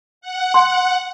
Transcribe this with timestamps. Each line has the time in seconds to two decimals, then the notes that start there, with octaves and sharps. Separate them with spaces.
0.21 F#5
0.54 C6